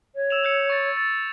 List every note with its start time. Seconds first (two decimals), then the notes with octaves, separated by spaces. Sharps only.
0.15 C#5
0.30 E6 E7 F7
0.43 E6 G6 C#7
0.69 C#6 A6
0.97 A6